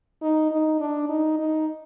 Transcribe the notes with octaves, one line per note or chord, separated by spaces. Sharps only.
D#4
D#4
D4
D#4
D#4